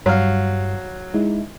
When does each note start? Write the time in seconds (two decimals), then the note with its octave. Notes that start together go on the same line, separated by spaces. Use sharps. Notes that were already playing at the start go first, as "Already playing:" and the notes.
0.06 G2 F#3 G3 F5
1.14 G#3 D#4 E4